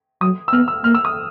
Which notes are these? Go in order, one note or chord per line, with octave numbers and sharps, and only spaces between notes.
F#3 D#6
E6
B3 F6
E6
A#3 F6
E6
D#6